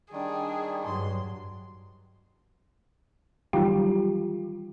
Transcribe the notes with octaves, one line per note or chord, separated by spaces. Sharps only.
D#3 G3 D4 G#4
G2 F#3 C6
D#3 E3 F#3 G3 F4 G4